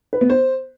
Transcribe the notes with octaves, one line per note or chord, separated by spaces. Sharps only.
B4
B3
C5